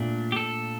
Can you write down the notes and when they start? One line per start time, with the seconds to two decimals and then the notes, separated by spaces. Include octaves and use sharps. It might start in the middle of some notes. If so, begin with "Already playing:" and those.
Already playing: A#2 A3 D4
0.32 G4
0.36 A4